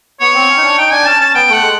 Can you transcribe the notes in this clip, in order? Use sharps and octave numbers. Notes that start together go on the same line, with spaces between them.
B3 C#5
C4
C#4
D#4
D4
D#4 G5
D4 G#5
C#4 A5
C#4 A5
B3 G5
A3 F#5
G#3